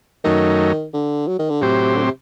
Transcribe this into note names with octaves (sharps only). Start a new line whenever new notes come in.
F#2 D#3 F#3 A3 D#4
D3
F#3
D#3
D3
A2 C3 F#3 C4 G4 C5
D3
C3